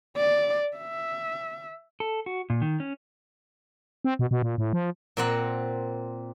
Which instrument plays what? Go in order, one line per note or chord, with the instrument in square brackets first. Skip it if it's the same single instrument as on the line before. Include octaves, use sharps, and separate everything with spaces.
[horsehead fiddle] D5
E5
[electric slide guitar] A4
F#4
A#2
D#3
C#4
[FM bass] C4
B2
B2
A#2
A2
F3
[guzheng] A#2 C4 F#5 A#5